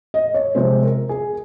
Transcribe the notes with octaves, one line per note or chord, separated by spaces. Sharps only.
D#5
C#5
C3 F3 G#3 C4 C5
A#4
G#4